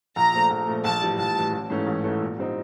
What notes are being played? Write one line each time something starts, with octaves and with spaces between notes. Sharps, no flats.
A#1 A#5
A#2 F3 A3
A#1
A#2 F3 A3
A#1 A5
A2 E3 G3
A#1 A5
A2 E3 G3
A1
G#2 E3 A3 C#4
A1
G#2 E3 A3 C#4
A#2
G3 C4 D#4